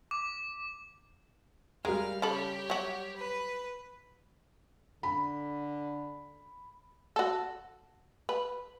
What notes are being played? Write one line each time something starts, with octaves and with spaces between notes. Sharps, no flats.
D6
G3 G#3 A#4 F5
C#3 G4 A4 C#5 B5
F#3 F#4
B4
D3 B5
F#4 A4
B4